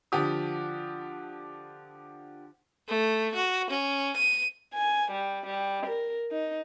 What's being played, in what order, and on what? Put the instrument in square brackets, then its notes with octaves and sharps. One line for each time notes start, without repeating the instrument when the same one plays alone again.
[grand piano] D3 F3 G4 D#6
[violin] A3
F#4
C#4
D#7
[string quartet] G#5
G3
G3
A#4
D#4